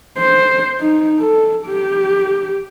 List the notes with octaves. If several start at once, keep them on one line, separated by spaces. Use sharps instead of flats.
C5
D#4
A4
G4